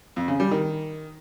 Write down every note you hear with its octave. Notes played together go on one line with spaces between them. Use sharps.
F2
C#3
G3
D#3